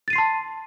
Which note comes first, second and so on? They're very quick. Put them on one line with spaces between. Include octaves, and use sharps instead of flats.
A6 D#7 C7 C6 A5